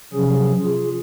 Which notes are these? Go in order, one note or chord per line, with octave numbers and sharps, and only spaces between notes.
C3 F3 F#3 C#4 G#4
F4 G#4